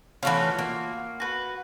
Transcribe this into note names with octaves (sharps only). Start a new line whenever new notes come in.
E3 A3 C#4 F4 F#4
A#3
F#4 B4